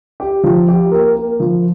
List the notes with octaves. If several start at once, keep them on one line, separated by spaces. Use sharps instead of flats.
G4
F3
G4
A#3
A#3
F3